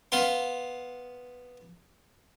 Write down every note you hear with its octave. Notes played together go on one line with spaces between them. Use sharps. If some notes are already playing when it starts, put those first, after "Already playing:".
B3 F5 C6